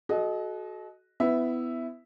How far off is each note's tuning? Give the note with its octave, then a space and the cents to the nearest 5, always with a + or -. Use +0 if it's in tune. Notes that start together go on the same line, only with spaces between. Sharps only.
F#4 +0 A4 -40 D#5 +0
B3 +25 E4 +0 E5 +0